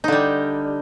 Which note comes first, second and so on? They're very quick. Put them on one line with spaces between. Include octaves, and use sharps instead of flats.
D#4 D3 G3